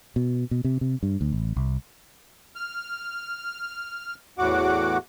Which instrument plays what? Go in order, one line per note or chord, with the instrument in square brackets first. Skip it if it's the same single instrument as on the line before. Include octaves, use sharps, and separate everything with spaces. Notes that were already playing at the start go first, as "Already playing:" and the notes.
[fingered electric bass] B2
B2
C3
C3
G2
D2
A1
C2
[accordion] F6
E2 A2 F#4 F#5 D6